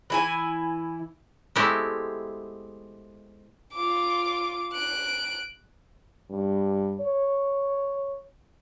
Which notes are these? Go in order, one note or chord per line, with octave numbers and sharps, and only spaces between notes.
E3 E4 G#5
G#3 A3 B3 C4 E4 G4
F4 D6
F#6 D7
G2
C#5